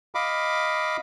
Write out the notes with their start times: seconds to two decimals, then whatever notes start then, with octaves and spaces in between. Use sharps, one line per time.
0.15 D#5 F5 B5 D6